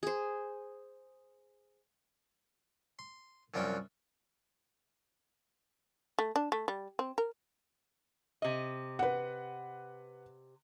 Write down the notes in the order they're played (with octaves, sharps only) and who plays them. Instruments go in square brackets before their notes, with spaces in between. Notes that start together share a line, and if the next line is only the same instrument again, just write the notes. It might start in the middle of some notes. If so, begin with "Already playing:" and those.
[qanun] G#4 C5
[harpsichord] C6
C2 F#2 F3 G3 F#4 G5
[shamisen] A3
D4
A3
G3
C4
A#4
[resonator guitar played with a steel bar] C3 D#5
[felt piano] B4 F#5